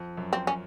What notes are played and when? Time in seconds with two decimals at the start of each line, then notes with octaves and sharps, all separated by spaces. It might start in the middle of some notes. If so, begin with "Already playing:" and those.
Already playing: F2
0.17 F#2
0.33 C4
0.47 C#4